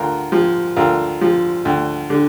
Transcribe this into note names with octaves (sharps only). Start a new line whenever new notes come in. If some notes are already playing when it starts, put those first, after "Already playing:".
Already playing: D2 F4 A#4
F3
D2 F4 A#4
F3
D2
D3